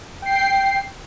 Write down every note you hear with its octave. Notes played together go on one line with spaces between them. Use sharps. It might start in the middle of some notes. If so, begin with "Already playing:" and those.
G5 C7